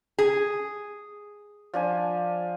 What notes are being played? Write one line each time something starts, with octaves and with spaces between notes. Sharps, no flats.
G#4
F3 D4 G#5